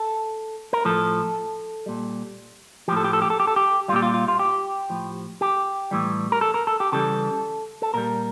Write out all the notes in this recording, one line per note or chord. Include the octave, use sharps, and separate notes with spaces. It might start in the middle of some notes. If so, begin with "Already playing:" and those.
Already playing: A4
A#4
A2 F3 A4
A#2 G3
A2 F3 G4 A4
G4
A4
G4
A4
G4
A4
G4
A#2 G3 F4 G4
F4
F4
F4
G4
A2 F3
G4
A2 E3 G3
A#4
A4
A#4
A4
G4
C#3 E3 G3 A4
A4
A#2 G3 A#4